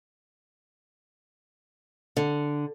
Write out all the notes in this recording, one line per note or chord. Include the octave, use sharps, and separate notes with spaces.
D3